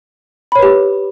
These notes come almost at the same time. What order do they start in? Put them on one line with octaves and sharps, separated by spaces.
B5 C#5 B4 G4